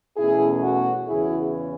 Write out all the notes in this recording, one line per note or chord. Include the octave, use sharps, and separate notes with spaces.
E2 B2 A3 C#4 E4 G#4
F#4
E2 C#3 E3 E4 G#4